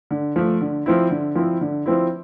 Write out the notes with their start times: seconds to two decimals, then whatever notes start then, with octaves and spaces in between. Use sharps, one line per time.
0.11 D3
0.36 F3 A3
0.61 D3
0.86 F3 C4 E4
1.10 D3
1.35 F3 C4 E4
1.61 D3
1.86 F3 C4 E4